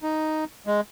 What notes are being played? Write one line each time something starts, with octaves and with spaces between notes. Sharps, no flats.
D#4
G#3